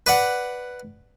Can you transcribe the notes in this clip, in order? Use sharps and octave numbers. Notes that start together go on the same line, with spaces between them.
B4 D5 F#5